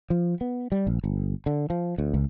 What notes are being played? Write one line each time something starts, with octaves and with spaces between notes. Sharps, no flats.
F3
B3
G3
A#1
G1
D3
F3
D2
C#2